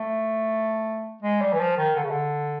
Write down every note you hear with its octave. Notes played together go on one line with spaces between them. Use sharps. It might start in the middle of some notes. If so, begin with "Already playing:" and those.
Already playing: A3
G#3
G3
E3
F3
D#3
D3
C#3
D3